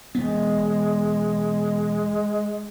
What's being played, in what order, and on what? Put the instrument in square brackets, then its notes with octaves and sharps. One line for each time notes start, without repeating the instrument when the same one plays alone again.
[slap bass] E1 B3 [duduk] G#3